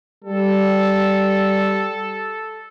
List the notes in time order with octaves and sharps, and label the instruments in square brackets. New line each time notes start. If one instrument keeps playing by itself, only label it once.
[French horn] G3 [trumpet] A4